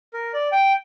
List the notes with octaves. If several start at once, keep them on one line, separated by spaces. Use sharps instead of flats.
A#4
D5
G5